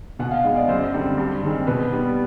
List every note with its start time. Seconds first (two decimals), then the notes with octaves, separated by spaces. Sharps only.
0.19 B2 F#5
0.31 F5
0.44 G#3 B3 D#5
0.56 D5
0.68 F#2 C5
0.94 D3 G3 C4
1.18 G2
1.43 D#3 G#3 C4
1.67 B2 B4
1.92 G3 B3